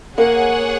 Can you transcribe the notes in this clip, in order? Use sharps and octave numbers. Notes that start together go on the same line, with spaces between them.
A#3 G#4 C#5 F#5